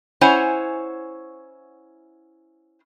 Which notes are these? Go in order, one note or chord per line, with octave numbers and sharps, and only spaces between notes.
C#4 E4 C5 C#5 F#5 G#5